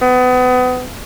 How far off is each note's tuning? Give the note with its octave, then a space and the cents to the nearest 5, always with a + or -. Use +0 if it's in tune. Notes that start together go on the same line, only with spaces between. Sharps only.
B3 +30